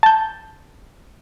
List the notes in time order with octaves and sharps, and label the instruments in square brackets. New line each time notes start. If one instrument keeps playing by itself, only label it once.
[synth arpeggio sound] A5 G6